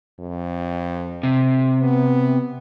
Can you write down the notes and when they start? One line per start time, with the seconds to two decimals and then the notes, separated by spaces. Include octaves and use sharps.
0.20 F2
1.23 C3
1.81 B3